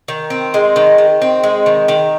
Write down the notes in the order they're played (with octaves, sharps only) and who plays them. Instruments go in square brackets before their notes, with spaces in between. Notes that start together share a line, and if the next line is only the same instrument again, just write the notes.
[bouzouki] D#3
C4
G#3
D#3
D#3
C4
G#3
D#3
D#3